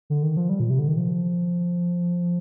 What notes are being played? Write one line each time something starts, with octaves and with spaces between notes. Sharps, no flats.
D3
D#3
F3
G3
A#2
C3
D3
D#3
F3